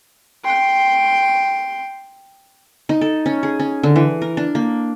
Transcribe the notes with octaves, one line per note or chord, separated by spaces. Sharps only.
G5 C6
D#4
A4
C#4
G#4
C#4
D3
E3
A#4
D4
A#3